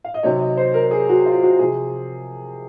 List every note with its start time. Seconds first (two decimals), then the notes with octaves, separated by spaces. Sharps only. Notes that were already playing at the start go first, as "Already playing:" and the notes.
0.04 F5
0.14 D#5
0.23 C3 D#3 F#3 C#5
0.40 D#5
0.57 C5
0.74 A#4
0.91 G#4
1.09 F#4
1.26 F4
1.43 F#4
1.59 C3 F3 G#4